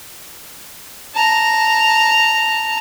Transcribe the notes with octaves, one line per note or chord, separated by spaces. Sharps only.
A5 A#5